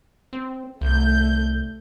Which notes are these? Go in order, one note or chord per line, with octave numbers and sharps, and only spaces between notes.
C4
C2 A3 G6